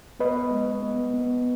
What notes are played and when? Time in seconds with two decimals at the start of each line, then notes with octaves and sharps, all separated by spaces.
0.19 B3 B4 D#5
0.51 G#3
0.83 B3
1.14 B3